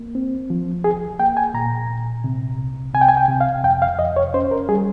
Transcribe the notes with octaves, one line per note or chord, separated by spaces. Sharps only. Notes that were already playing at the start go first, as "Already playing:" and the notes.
Already playing: A#3
C4
F3
C2 G#4
A#3 G5
G#5
A#2 A#5
A#2
C3
C2
C3 G#5
G5
G#5
G5
C3
F5
F2 G5
F5
F2 D#5
C#5
C#4 C5
A#4
G3 G#4